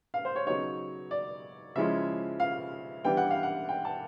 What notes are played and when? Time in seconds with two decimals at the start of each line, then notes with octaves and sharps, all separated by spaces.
0.14 F5
0.25 C5
0.36 C#5
0.46 C#3 F#3 B3 D#4 C#5
1.11 D5
1.75 C#3 F3 G#3 C#4 E4 E5
2.40 F5
3.04 E3 G3 B3 D4 G5
3.17 F#5
3.31 F5
3.43 F#5
3.69 G5
3.85 A5